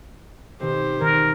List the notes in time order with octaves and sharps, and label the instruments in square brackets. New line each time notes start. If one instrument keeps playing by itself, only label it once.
[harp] B2 D#3 C4 [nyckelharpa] G4 C5
[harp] D#1 D#3 G#6 [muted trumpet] A#4